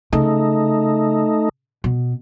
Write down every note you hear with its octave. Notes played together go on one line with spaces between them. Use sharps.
C#3 A3 D#4
B2